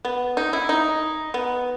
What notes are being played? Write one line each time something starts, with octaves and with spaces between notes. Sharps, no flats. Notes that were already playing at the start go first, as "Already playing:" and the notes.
B3
D#4
E4
D#4
B3